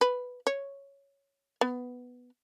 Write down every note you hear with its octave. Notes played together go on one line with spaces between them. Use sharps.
B4
C#5
B3